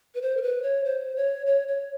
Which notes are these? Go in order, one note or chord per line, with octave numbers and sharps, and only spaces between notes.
B4
C5
A#4
B4
C#5
C5
C#5
C#5
C#5